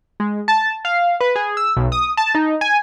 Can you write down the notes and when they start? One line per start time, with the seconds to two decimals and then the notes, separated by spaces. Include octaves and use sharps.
0.20 G#3
0.48 A5
0.85 F5
1.20 B4
1.36 G#4
1.57 E6
1.76 B1
1.92 D#6
2.17 A5
2.35 D#4
2.61 G#5